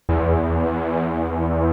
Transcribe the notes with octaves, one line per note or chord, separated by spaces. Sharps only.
E2